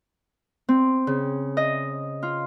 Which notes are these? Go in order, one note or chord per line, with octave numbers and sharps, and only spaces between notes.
C4
C#3
D#5
F4